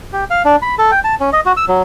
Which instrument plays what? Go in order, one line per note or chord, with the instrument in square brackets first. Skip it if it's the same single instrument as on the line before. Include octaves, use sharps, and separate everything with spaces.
[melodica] G4
F5
D4
B5
A4
G5
A5
C#4
D#5
F#4
E6
F#3